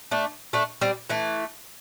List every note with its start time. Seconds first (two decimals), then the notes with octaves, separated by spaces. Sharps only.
0.11 A3 D4
0.53 A3 D4
0.81 G3 C4
1.10 E3 A3